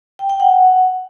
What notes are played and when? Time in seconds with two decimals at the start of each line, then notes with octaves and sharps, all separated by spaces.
0.19 G5
0.29 G5
0.40 F#5